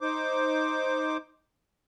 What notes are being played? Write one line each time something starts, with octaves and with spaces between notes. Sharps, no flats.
D#4 C5 D6